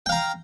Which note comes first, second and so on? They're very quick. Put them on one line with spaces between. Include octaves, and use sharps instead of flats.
G5 F5 A#5